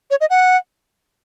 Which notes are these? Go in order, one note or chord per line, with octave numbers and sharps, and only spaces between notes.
C#5
D#5
F#5